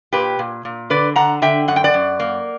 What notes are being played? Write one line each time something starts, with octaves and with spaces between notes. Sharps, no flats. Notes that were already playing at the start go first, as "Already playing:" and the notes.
A#2 G4 B4
A#2
A#2
D3 B4 D5
D3 F#5 A#5
D3 E5 G5
F#2 F#5
G5
D5 F#5
F#2
A#3